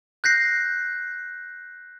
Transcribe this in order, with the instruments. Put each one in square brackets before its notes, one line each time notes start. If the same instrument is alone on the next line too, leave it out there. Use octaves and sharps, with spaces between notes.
[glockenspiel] F#6 G6 A#6 C7